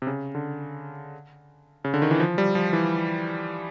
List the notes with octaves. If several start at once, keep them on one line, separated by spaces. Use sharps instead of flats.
C3
C#3
D3
C#3
D3
D#3
E3
F3
G3
F3
E3